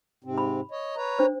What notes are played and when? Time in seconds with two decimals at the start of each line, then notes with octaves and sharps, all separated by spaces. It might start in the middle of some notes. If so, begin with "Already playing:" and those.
0.24 G#2 C3 C4
0.38 B5
0.71 C#5 D#5
0.96 B4 C#5 A#5
1.19 D4 C5